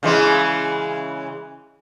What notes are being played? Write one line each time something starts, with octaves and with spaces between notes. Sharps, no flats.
C#3 E3 G#3